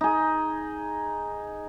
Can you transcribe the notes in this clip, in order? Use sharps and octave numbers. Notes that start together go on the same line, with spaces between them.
D#4 G#4